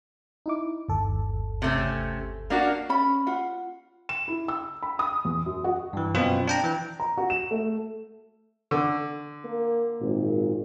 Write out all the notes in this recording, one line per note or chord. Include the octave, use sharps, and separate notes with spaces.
D#4 E4 D6
G1 D#2 A4
C3 A3 C#4
A#3 D4 F#4
C#4 B5
F4 F#5
E7
E4
E6
B5
D#6
E2
F#2
F#4
G2 E3
F#2 B2 C4 F4
D4 G5 A#5
E3 G5
A#5
F#4
E7
A3
D3
A#3
G#1 A#2